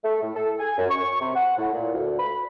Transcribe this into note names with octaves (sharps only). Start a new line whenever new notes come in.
A3
A2
A4
G#5
F#2
C#6
C3
F#5
A2
A#2
D2
B5